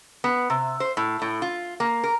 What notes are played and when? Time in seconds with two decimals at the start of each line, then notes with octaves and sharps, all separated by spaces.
0.24 B3
0.50 C3
0.80 C5
0.97 A2
1.22 A2
1.42 F4
1.80 A#3
2.04 A#4